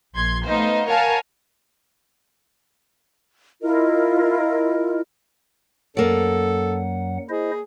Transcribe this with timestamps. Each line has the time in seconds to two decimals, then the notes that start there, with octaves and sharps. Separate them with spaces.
0.14 A#1 C6 G#6
0.47 A3 B3 D#4 C5 F5
0.87 A#4 C#5 F5 F#5 G#5 A5
3.61 E4 F4 A#4 D#5
5.97 F#2 F#3 A#3 A4 D5 F#5
7.29 E4 G#4 C5 D#5